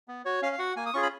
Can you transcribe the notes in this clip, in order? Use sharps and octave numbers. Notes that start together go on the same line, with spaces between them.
B3
F#4 C#5
C#4 F5
F5
F#4 F#5
A#3 G#5
D#6
C#4 F4 G#4 C#6
B5